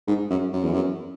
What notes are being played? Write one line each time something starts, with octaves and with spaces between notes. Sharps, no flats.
G#2
F#2
F#2
E2
F#2